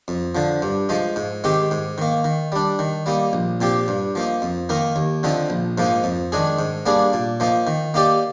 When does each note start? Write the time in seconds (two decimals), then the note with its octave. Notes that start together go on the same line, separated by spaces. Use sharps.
0.08 F2
0.35 D3 F3
0.62 G2
0.89 F3 G#3 D#4
1.16 G#2
1.44 D#3 G#3 C4 G4
1.71 G#2
1.98 D#3 A#3
2.24 D#3
2.52 G3 D4
2.79 D#3
3.06 G3 A#3 D#4
3.33 A#1
3.61 A#2 F3 C4 G4
3.88 G2
4.15 F3 A#3 D#4
4.42 F2
4.69 D#3 A#3 D#4 A#4
4.96 D#2
5.23 D3 F3 C4 D#4
5.50 A#1
5.78 G#2 F3 A#3 D#4
6.04 F2
6.32 D#3 G#3 D4 G#4
6.59 G#2
6.86 G3 A#3 D4 G#4
7.13 A#2
7.40 F3 A#3 D#4
7.67 D#3
7.94 A#3 D#4 G4 D5